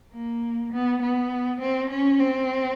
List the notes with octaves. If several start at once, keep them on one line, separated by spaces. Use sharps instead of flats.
A#3
B3
B3
C4
C#4
C4